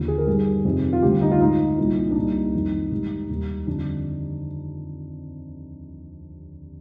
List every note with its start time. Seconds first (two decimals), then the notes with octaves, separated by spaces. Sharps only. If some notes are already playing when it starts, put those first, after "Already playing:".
Already playing: D#2 D3 F3
0.08 G#4
0.18 A#4
0.27 G2 D#3 G3 G#4
0.65 F2 C3 D#3 G3
0.93 F4
1.02 D2 D3 G3 G4
1.21 D#4
1.32 F4
1.40 G#2 F3 D#4
1.78 C2 A#2 F3
2.11 D4
2.16 C2 A#2 G3 D#4
2.53 F2 D#3 G3
2.91 G#2 D#3 G3
3.29 D#2 D#3 G3
3.67 F2 D3 G3 D4